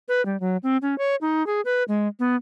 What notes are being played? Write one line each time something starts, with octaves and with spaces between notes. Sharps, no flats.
B4
G3
F#3
C4
C#4
C#5
D#4
G#4
B4
G#3
B3